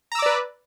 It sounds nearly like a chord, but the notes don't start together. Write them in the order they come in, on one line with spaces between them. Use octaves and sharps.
A#5 E6 D6 D5 B4